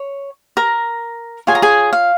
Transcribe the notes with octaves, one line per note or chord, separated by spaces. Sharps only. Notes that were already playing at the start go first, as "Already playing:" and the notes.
Already playing: C#5
A#4 A#5
F4 G#4 C#5 G#5
A#5
G#4 G#5
F5